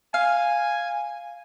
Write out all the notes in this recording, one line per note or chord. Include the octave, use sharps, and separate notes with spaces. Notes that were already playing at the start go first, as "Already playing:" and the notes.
F5 G#5